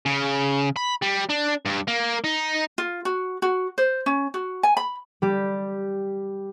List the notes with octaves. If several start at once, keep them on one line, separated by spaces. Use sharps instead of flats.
C#3
B5
G3
D4
G2
A#3
D#4
F4
F#4
F#4
C5
C#4
F#4
G#5
B5
G3 G4